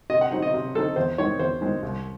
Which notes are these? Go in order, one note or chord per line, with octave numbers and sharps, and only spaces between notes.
C3 D#5
F#5
F#3 C4 D#4
D#5
C3
F#3 C4 D#4 A4
E2 C5
D#3 G#3 C4 C#5
E2 C5
D#3 G#3 C4
C2